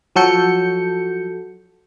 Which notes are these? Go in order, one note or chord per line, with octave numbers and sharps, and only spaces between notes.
F3 F#3 F#4 A4 G6 C#7